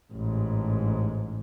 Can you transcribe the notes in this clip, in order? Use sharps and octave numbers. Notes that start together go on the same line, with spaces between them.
A1 G#2